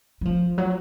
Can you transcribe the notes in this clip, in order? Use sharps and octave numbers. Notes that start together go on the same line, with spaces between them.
F#3
F3
F#3